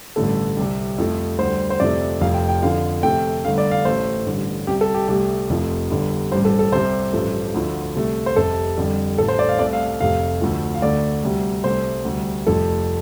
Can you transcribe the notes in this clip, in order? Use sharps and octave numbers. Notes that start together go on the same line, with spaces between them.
A1 G2 D3 A3 A4
C2 C3 G3
F2 F3 A3
D2 D3 G3 C5
C5
F2 C3 F3 A3 D5
F1 F2 F3 A3 F5
G5
G5
F2 D3 F3 F5
F2 C3 A3 G5
G1 G2 D3 A3 F5
D5
F5
A1 A2 A3 C5
A1 G2 D3
C2 C3 G3 G4
A4
G4
C2 C3 A3 G4
F1 F2 F3 A3
G1 G2 D3 G3
A1 G2 G3 C5
A4
A4
C2 C3 G3 C5
A1 G2 F3 A3
D2 D3 F3 A3
C2 C3 A3
C5
F1 F2 C3 A4
F2 D3 G3
A1 A2 A3 A4
C5
D5
F5
C2 C3 A3 D5
F5
F5
F1 F2 C3 A3 F5
D2 D3 F3 A3
F5
D2 D3 A3 D5
D2 C3 G3
C2 C3 A3 C5
D2 C3 G3
F1 F2 F3 A3 A4